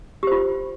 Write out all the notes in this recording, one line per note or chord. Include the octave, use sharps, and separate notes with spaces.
F4 G4 C5